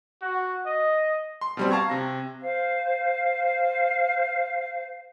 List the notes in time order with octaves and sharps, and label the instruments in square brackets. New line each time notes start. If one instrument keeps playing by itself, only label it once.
[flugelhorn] F#4
D#5
[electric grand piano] C6
B2 G3 C4
F5 A5 A#5 C#6 G#6
C3 A#6
[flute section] C5 F5